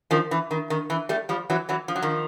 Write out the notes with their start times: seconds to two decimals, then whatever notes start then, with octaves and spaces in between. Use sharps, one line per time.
0.11 D#3 F3
0.31 E3
0.51 D#3
0.70 D#3
0.90 E3
1.09 G3 A3
1.29 F3 G3
1.50 E3 F#3
1.69 E3 F#3
1.88 F3
1.96 F#3
2.02 D#3 F3